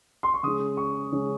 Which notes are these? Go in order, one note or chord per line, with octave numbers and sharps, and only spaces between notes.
C6
C#6
C#3 G#3 C#4 D#6
C#6
C#3 G#3 C#4